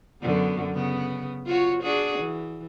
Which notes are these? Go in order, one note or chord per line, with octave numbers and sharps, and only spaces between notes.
F#2 D3 B3
C#3 B3
F4 F#4 C#5
D4 F#4 G#4
E3